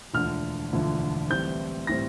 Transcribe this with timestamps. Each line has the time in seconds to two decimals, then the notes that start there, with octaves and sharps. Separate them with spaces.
0.14 E1 D2 D3 F3 F6
0.73 E1 D2 D3 F3
1.30 A1 A2 G3 C4 G6
1.87 A2 G3 C4 A#6